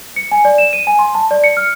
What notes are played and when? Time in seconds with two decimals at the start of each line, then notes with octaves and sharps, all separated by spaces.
0.16 C#7
0.32 G#5
0.45 D5
0.58 E7
0.73 D#7
0.87 G#5
0.99 C6
1.15 A5
1.31 D5
1.44 C#7
1.57 F6